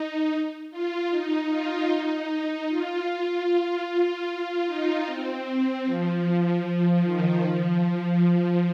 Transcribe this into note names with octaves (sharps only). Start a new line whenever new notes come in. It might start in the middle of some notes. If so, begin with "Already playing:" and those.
Already playing: D#4
F4
D#4
F4
D#4
F4
F4
F4
D#4
C4
F3
F3
D#3
F3
F3